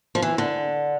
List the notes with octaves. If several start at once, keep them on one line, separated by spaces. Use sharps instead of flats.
F3
E3
D3